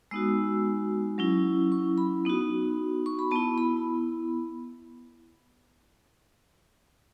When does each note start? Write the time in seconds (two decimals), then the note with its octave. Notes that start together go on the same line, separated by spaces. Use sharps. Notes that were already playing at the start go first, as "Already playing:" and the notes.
0.11 G#3 B3 D#4 F#4 E6
1.18 F#3 C#4 E4
1.72 C#6
1.98 B5
2.25 B3 D#4 F#4
3.06 C#6
3.19 B5
3.31 B3 E4 A5
3.58 B5